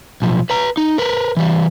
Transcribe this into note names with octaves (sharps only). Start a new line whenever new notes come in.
B1 F3
B4 A#5
D#4
A#4 B4
E3 G3